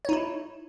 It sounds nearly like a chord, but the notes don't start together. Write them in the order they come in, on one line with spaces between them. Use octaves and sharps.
C#5 D#4 E4